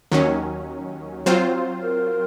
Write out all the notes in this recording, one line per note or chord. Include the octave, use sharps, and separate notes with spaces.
D#2 D#3 F#3 C#4
F#3 C4 F4 C5
A#4